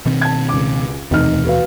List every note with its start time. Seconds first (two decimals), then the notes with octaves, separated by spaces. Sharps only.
0.06 B2 D#3 C4
0.21 A5 G#6
0.49 C#2 D6
1.11 F1 D#2 B2 E3 D#4 F6
1.44 F#4 B4 F5